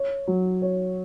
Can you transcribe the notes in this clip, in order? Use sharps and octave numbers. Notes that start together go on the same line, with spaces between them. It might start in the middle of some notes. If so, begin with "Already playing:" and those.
Already playing: C#5
F#3
C#5